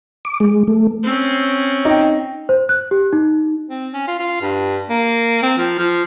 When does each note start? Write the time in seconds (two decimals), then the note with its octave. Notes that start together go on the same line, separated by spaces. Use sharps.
0.25 D6
0.40 G#3
0.68 A3
1.03 C4 C#4
1.85 D#4 G5
2.49 C5
2.69 F#6
2.91 G4
3.13 D#4
3.70 C4
3.93 C#4
4.08 F4
4.19 F4
4.42 G2
4.89 A#3
5.43 C4
5.58 F3
5.79 F3